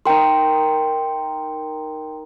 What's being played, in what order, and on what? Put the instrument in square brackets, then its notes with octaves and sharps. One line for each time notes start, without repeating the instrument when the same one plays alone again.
[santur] D#4 A#4 [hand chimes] G5 C6